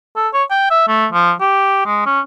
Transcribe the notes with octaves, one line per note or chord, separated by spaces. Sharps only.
A4
C#5
G5
E5
A3
F3
G4
G#3
C#4